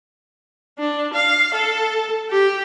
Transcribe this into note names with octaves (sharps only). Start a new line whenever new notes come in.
D4
F5
A4
G4